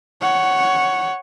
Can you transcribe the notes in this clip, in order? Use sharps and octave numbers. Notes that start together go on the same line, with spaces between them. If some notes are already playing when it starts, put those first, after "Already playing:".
C#5 F#5